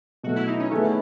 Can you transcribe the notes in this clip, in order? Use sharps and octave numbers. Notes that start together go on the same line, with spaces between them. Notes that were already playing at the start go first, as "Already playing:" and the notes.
B2 F#3 A3 F#4
E4
D#4
C#4
A3 B3 E4 G#4 B4